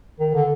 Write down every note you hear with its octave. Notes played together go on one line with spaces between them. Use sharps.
D#3
D3